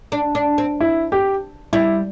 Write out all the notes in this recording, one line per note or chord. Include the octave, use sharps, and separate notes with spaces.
D4
D4
C4
E4
G4
G3 E4